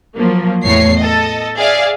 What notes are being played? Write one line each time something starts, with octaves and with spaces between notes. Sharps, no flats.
F3 F#3 A#3
E2 A2 C#5 C7
A4 D#5
G#4 D5 E5 F5